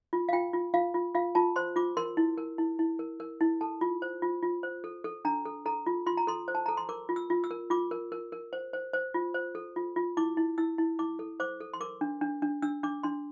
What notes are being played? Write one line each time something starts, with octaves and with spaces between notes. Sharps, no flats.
F4
F5
F4 G5
F4
F4 F5
F4
F4 F5
F4 A5
C5 C6
F4 D6
A#4 C6
E4
A#4
E4
E4
A#4
A#4
E4
A4 A5
F4
C5
F4
F4
C5
A4
A4
D4 A#5
A4
A4 A#5
F4
F4 C6
A#5
A4 C6
C5
A5
A4 A#5
C6
A#4 D6
F4
E6
F4
E6
A#4
F4 D6
A#4
A#4
A#4
C5
C5
C5
F4
C5
A4
F4
F4
E4 D6
E4
E4 E6
E4
E4 D6
A4
C5 D6
A4
C6
A#4 D6
D4
D4
D4
D4 E6
D4 D6
D4 C6